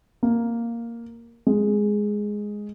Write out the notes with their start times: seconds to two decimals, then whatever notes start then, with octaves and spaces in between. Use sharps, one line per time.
0.23 A#3
1.47 G#3